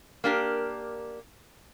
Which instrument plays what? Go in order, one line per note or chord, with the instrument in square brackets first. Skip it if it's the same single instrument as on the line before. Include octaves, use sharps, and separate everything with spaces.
[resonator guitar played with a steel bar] A#3 D4 G4 A#4